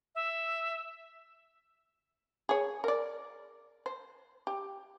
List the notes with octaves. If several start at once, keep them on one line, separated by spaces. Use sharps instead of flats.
E5
G#4 C#5
A#4 D5
C5
G4